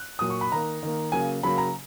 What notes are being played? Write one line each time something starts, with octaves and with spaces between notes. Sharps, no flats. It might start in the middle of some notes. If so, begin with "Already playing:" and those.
Already playing: F#6
A#2 F#3 A#3 D#6
C#6
B5
D#3 A#3 A#5
D#3 A#3
C#3 F#3 A#3 G#5
C#3 F#3 A#3 B5
A#5